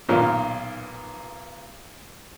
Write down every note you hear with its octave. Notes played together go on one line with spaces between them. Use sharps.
B1 A#2 D#3 C#5 F6